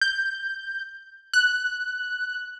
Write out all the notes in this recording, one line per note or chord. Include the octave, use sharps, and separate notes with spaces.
G6
F#6